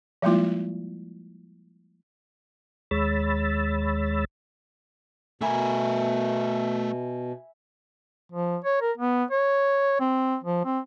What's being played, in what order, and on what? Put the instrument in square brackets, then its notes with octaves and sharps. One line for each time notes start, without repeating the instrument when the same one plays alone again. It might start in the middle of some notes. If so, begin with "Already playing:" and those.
[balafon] F3 G3 G#3 A#3 E4 F4
[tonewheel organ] D#2 G#3 C#5 B5 E6 A6
[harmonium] B2 [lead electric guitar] A3 A#4 [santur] E5 G#5 B5
[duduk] F3
C#5
A#4
B3
C#5
C4
F3
C4